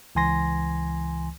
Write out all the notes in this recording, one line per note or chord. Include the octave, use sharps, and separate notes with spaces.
C#2 E3 G#5 C6 A#6